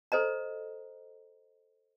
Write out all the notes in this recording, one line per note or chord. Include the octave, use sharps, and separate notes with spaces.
A4 C5 D#5 A#5